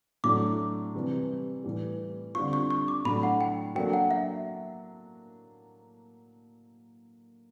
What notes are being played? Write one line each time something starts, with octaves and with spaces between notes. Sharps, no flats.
A2 F#3 A3 D4 D6
C3 E3 G3
A2 E3 G3
D3 G3 C4 F4 C#6
C#6
C#6
D6
A2 F#3 A3 D4 B5
F#5
G5
F#3 A#3 D4 F#4 A4 G5
F#5
E5